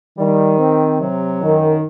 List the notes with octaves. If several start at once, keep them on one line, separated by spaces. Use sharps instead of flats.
D#3 G3
C4
C3 F#3
F#2 D#3